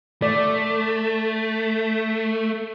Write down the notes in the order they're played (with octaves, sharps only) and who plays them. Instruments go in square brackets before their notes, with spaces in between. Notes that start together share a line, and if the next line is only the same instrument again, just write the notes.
[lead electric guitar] A3 [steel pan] D5